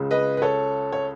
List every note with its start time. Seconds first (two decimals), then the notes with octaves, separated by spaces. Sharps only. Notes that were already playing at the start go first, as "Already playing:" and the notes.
Already playing: C#2 C#3 G#3
0.11 B4 D#5
0.37 B4
0.42 A4 C#5
0.93 C#5